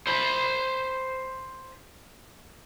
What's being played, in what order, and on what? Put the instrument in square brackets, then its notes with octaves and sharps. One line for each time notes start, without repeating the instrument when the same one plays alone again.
[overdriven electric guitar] C5 B5